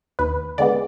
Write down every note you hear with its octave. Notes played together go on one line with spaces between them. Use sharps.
D#2 B4
D3 G#3 B3 D5